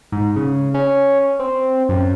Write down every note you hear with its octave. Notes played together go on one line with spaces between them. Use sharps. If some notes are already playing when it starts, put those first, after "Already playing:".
G#2
C#3
C#4
C4
F#2